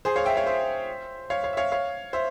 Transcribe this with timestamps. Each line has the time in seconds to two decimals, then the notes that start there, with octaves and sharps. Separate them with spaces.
0.05 G#4 C5
0.16 C#5 F5
0.26 E5 G5
0.37 C#5 F5
0.46 C5 E5
1.30 C#5 F5
1.44 C#5 F5
1.53 E5
1.57 C#5 F5
1.72 C#5 F5
2.13 C5 E5